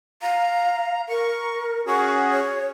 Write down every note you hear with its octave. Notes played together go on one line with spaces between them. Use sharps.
F5 A#5
A#4 C#6
C#4 F#4 G#4 C#6
C#5